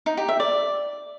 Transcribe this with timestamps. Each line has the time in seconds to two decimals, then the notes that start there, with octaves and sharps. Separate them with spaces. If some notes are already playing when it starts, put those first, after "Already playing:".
0.06 D#4
0.17 G4
0.29 E5
0.40 D5